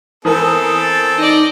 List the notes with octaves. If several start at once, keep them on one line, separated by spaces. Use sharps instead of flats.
E3 B3 C4 A4 A#4 G#5 D#6
A6
D#4 D5 D#5